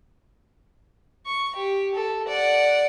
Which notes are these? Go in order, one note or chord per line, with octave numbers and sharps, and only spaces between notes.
C#6
G4
A4
D5 F#5